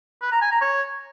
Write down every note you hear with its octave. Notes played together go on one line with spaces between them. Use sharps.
B4
A#5
G#5
A#5
C#5